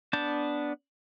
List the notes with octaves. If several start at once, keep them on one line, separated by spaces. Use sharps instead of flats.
B3 D4 A5 G6